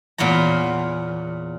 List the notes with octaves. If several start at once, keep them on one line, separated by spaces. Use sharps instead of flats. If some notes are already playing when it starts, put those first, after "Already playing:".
E2 A#2 B3 C#5 A#5